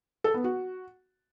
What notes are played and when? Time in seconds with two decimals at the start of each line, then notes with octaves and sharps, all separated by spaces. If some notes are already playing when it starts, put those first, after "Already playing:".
0.24 A4
0.34 B3
0.44 F#4